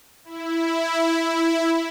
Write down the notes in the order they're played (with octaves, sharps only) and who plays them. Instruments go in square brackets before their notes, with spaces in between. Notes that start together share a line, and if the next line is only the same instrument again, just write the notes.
[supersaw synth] E4
E4